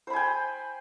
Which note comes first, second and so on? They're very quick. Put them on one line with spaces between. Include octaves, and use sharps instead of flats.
C5 B5 G#5 G5